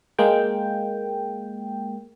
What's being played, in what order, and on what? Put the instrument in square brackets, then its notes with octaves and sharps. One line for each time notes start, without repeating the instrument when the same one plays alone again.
[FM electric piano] G#3 A#3 G5